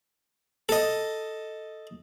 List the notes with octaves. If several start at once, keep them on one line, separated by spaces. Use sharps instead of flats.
A4 D#5